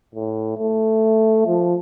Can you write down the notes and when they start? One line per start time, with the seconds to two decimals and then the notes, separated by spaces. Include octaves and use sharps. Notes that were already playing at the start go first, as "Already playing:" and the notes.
0.15 A2
0.58 A3
1.47 F3